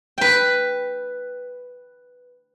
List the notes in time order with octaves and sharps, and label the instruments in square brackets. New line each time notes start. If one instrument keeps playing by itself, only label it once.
[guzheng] B4 G5